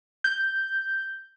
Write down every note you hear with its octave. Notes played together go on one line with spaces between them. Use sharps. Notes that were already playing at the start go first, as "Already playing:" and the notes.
G6